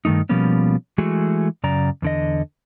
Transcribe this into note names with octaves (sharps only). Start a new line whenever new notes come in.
G2 D#3 F3 A3 D#4
B2 F3 G3 A#3 B3 C#4
E3 G#3 A3 F#4 G#4
F#2 C#3 D5 A#5
E2 D3 D#5